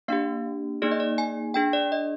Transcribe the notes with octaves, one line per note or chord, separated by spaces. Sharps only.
A#3 D4 G4 F5
A#3 D#4 G#4 D5
D#5
D5
G#5
D4 G#4 G5
D5
D#5